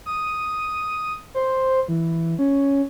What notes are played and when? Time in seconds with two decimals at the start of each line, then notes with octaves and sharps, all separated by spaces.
0.06 D#6
1.34 C5
1.88 E3
2.39 C#4